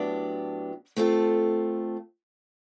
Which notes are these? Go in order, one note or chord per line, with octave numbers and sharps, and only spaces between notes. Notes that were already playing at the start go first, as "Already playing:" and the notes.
Already playing: A2 F#3 B3 D4 G4
A3 C4 F4 A4